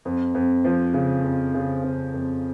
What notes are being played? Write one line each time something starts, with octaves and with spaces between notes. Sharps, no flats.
F2
F2
F3
C#3
F2
C#3
C#3
F2